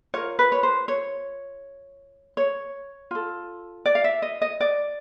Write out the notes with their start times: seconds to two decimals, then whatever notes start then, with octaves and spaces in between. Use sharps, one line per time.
0.14 F4 A#4 C#5
0.39 B4
0.52 C#5
0.63 C5
0.88 C#5
2.37 C#5
3.11 F4 A4
3.86 D5
3.95 F5
4.04 E5
4.22 D#5
4.42 D#5
4.61 D5